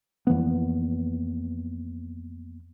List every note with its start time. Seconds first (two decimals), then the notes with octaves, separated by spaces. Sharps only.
0.27 F2 E3 A#3 B3